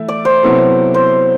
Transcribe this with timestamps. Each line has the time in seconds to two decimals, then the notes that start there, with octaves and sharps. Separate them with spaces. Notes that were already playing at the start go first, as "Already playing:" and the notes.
Already playing: E3 A3 E4 E5
0.08 D5
0.25 C5
0.43 C3 F#3 B3 E4 A4
0.94 C5